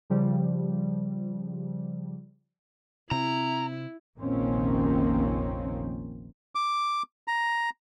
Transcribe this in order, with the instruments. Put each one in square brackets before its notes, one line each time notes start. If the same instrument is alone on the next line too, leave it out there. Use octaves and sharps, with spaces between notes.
[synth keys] C#3 F3 G3
[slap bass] C3 C4 [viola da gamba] E4 [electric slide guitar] A#5
[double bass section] F1 A#1 D#3 A#3 C4 C#4
[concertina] D6
A#5